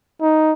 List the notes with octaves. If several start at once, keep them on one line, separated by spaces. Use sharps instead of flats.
D#4